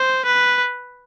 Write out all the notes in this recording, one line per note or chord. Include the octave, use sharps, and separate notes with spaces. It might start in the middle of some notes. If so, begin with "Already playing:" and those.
Already playing: C5
B4